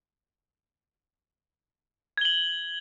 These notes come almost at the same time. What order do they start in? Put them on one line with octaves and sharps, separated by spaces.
G#6 G7 F#7